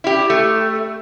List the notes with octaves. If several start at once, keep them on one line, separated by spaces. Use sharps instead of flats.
E4 G4
A3